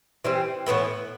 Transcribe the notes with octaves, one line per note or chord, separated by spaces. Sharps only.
E3 G3 C4
A2 E3 B3 E4